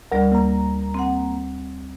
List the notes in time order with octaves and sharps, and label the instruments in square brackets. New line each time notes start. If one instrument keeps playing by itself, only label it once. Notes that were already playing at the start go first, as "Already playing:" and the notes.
[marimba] D2 G3 D5 [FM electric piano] A#4
[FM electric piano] A#3 A#5
[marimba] C4 F#5